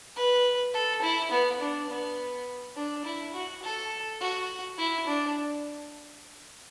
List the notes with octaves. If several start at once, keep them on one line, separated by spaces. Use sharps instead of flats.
B4
A4
E4
B3
D4
B3
D4
E4
F#4
A4
F#4
E4
D4